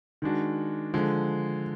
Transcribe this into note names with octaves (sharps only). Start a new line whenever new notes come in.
D#3 G#3 D4 F#4
D3 F3 G#3